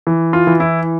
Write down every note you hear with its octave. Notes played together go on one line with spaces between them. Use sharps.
E3
F4
E3
E4